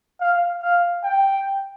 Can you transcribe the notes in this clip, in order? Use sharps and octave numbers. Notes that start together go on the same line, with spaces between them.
F5
F5
G5